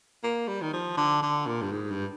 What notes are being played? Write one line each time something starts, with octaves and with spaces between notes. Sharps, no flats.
A#3
G3
D#3
F3
D3
D3
A#2
G2
G#2
G2